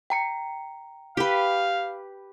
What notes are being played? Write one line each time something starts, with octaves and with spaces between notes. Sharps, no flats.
G5 A#5 C#7
G4 B4 F5